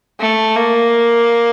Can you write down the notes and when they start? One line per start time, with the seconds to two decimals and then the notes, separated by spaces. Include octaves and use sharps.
0.20 A3
0.56 A#3